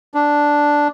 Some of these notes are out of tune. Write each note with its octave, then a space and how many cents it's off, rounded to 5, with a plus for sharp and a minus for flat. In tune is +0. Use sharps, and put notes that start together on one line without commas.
D4 -5